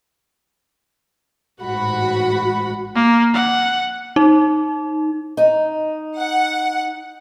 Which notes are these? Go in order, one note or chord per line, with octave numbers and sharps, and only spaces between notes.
A1 G#2 F#4 F#5 B5
A#3
F#5
D#4
D#4
F#5